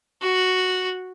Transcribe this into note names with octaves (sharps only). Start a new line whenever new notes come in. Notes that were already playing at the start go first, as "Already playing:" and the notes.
F#4